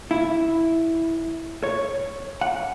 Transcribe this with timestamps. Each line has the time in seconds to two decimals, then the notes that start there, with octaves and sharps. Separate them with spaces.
0.11 E4
1.63 C#5
2.41 F#5